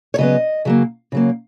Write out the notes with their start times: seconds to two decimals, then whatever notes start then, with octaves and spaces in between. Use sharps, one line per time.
0.14 C#5
0.18 C#3 F#3 B3 D#5
0.65 C#3 F#3 A#3
1.12 C#3 F#3 A#3